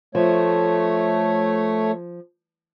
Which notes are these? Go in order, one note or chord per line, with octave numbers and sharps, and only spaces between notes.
F3 A3 C#5